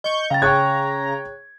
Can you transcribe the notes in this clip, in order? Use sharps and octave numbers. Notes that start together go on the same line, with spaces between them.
D#5 C#6 G6
C#3 F5 G5 A#5 A6
G#4 C#5 G5 C#6 F#6 G#6